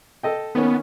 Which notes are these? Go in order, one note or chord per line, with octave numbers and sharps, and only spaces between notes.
A4 D#5 G5
D#3 A#3 B3 C#4